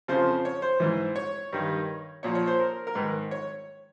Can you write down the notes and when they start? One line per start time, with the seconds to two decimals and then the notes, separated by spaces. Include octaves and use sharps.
0.08 F2 C#3 F3 C5
0.45 C#5
0.62 C5
0.80 G#2 E3
1.16 C#5
1.53 G2 D#3
2.23 A#2 F3 C#5
2.35 C#5
2.47 C5
2.59 A#4
2.87 A#4
2.95 G#2 D#3 B4
3.31 C#5